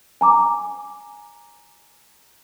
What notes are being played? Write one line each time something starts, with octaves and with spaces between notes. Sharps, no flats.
G#5 A#5 D6